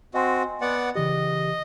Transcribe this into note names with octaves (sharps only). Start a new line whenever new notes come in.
C4 F#4 D#5 G#5 C6
B3 D5 F#5
C#3 E3 G4 D#5